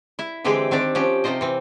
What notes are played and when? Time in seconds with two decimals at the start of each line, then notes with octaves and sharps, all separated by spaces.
0.19 E4 E5
0.44 D3 E3 G#3 C4 G4 G#4
0.71 D#3 C4 D4 G4 D5
0.95 F3 C#4 G4
1.24 C3 D#4 F4 C5 D#5
1.41 E3 C4